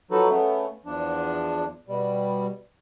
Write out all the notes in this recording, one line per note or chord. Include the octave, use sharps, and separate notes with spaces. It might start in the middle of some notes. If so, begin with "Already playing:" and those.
F3 F#3 D#4 F#4 A4 B4
C#3 A3 B3
E2 F3 D4
B2 G3